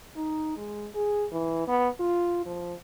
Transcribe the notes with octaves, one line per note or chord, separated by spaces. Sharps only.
D#4
G#3
G#4
E3
B3
F4
F3